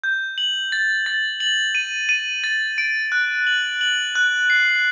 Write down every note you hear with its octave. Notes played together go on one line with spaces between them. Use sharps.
G6
F#7
A6
A6
F#7
D#7
D#7
A6
D7
F#6
F#7
F#7
F#6
C7